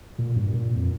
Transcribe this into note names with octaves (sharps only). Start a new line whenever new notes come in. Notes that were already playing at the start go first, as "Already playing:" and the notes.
A#2
G2
A#2
F2